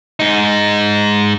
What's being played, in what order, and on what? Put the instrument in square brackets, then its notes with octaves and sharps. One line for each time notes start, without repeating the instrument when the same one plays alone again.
[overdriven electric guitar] G#2 D#4